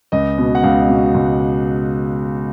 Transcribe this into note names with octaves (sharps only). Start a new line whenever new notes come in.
C#2 D#5
B2
F#5
C#2 F5
B2
C#2